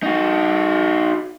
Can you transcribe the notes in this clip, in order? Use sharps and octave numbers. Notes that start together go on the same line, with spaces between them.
D#4 F#4